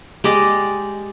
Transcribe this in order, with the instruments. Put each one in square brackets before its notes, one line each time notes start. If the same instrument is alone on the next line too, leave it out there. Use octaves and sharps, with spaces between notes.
[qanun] G#3 G4 D5 D#5